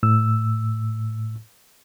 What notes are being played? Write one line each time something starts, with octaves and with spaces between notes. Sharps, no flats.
A2 E6